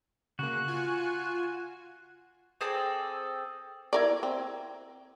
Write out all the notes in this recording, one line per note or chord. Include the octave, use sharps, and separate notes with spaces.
C#3 A#3 F#4 F#6
F4 G#5
C4 G#4 A4 D5
E4 A#4 D5
C4